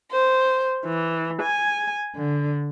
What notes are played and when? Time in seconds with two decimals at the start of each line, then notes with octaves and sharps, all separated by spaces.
0.11 C5
0.86 E3
1.42 G#5
2.16 D3